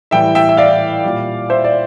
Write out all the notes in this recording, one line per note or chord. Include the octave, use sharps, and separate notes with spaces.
A2 E3 G3 E5 G5
E5 G5
E5
D5 F5
A#2 G3
C5 E5
D5